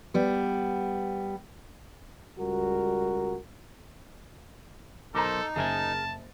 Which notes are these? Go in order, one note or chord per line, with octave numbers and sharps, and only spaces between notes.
G3 B3
C#2 G3 F#4 A#4
B1 D#4 A4 A#4 C5 A#5 D6
F#1 G#4 A#4 E5 G#5 A5 A6